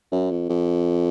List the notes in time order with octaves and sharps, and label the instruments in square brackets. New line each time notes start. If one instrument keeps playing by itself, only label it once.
[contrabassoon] F#2
F2
F2